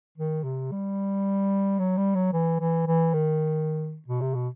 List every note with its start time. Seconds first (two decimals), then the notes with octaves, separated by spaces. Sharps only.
0.18 D#3
0.44 C3
0.72 G3
1.79 F#3
1.97 G3
2.15 F#3
2.33 E3
2.60 E3
2.87 E3
3.14 D#3
4.08 B2
4.21 C3
4.34 B2